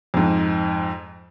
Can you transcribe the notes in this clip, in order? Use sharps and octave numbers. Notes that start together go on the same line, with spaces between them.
F2 G#2